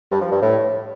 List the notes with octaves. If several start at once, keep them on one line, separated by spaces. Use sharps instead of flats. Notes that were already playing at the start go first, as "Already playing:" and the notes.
G2
F3
G2
A2